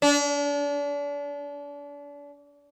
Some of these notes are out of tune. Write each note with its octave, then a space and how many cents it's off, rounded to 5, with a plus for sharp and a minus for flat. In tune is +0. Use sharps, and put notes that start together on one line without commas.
D4 -35